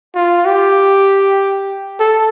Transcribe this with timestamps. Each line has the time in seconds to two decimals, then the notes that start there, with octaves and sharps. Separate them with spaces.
0.15 F4
0.46 G4
2.00 A4